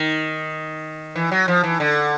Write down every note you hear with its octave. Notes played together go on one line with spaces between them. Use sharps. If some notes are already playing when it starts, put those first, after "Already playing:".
Already playing: D#3
E3
F#3
F3
E3
D3